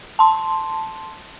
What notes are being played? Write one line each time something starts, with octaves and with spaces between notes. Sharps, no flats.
A5 C6